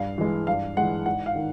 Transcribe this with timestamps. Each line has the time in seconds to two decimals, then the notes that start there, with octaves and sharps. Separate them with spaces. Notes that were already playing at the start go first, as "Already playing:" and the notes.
Already playing: G2 F5
0.18 E3 G#3
0.47 G2 F5
0.77 E3 G#3 F#5
1.06 G#2 F#5
1.26 F5
1.36 D#3